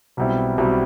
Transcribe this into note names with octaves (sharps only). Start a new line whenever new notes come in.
B1 B2 G3 C4 E4
B1 B2 G3 C4 E4